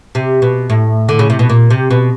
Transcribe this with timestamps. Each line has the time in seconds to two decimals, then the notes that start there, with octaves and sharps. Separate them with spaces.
0.15 C3
0.42 B2
0.70 A2
1.09 D3
1.19 C#3
1.30 C3
1.39 B2
1.50 A#2
1.70 C3
1.90 B2